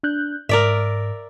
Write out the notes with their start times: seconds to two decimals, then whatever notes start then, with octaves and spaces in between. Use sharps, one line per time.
0.03 D4 F#6 G6
0.49 G#2 A#4 D5 E5